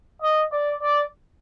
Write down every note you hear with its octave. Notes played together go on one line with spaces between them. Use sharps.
D#5
D5
D5